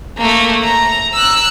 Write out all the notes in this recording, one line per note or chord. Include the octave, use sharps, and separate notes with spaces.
A3 A#3
A#5
E6 F#6